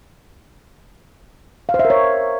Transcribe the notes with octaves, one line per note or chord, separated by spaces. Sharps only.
F5
C5
E5
A#4
C#5